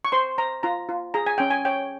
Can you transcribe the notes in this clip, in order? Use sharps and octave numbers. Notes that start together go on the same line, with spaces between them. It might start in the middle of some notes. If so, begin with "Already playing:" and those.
C#6
C5 C6
C5 A#5
F4 A#5
F4
G#4 A#5
G#5
C#4 G5
G#5
C#5 G5